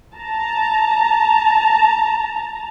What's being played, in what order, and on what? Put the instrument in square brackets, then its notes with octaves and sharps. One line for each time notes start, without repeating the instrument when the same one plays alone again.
[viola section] A5 A#5